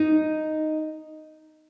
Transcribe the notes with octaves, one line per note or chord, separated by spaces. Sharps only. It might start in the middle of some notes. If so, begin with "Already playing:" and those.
Already playing: D#4